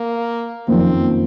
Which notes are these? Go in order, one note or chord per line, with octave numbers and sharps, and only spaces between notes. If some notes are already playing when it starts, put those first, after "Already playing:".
Already playing: A#3
F#1 F2 D#3 A#3 C4